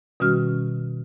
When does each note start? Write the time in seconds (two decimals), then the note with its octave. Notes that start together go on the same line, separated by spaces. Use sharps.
0.20 B2 D#3 G3 C#4 F#4 F6